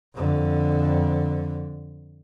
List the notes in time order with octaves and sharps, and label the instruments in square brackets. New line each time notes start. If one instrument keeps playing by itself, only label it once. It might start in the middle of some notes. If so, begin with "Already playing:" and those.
[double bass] F2 D3